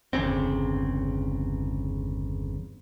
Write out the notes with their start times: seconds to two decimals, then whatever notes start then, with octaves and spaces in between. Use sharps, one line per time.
0.13 G1 E2 C#3 C4